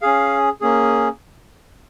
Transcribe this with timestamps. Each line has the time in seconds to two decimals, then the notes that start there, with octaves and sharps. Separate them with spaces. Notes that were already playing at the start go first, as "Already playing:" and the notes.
0.02 C#4 G#4 F5
0.61 A#3 C#4 G#4